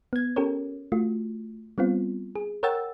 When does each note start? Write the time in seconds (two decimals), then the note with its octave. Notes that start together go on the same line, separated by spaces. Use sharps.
0.13 B3 G#6
0.36 C#4 G4 A4 A#4 C#5
0.92 A3 F4 F#4
1.78 G3 B3 C4 F4
2.36 G#4
2.63 A#4 C#5 F#5 G5 E6 A6